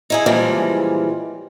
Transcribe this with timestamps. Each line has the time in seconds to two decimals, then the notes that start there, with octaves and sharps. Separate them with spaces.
0.10 D#4 E4 G#4
0.26 A#2 C#3 E3 F3 G3 G#3